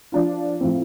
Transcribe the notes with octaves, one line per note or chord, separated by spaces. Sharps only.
F3 D4 F4
A2 F3 C4